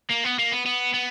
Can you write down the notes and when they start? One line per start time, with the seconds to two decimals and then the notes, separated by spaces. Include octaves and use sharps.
0.11 A#3
0.25 B3
0.39 A#3
0.52 B3
0.66 B3
0.94 B3